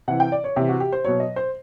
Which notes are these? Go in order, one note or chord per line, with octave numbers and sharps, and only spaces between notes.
C3 E3 F#5
G5
D5
C#5
C3 E3 G4
F#4
G4
C5
B2 F#3 C#5
D#5
C5